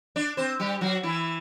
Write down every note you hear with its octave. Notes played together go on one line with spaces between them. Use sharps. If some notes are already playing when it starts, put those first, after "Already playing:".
D4 D5
C4 C5
G3 G4
F#3 F#4
E3 E4